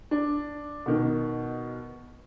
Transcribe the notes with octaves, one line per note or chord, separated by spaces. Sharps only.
D4
B2 D#3